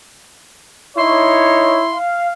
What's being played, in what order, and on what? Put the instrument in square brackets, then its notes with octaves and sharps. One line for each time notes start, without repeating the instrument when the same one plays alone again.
[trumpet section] D#4 C#5 [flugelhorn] E4 [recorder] C6
[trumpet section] F5